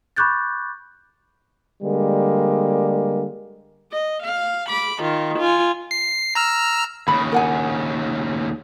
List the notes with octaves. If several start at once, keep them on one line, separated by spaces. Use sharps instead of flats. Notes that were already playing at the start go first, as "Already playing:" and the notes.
B5 C#6 D6 F#6 G6 A6
D3 G3 G#3 A#3
D#5
F5
B5 D6
D#3 F4
F4 G#5
C7
A#5 E6 F6
D#2 C#3 B5
A#4 F#5 G#5